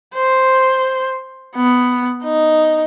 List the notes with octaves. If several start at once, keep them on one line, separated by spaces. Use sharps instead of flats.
C5
B3
D#4